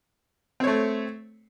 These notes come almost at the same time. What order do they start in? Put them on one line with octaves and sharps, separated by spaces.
C4 C#5 A3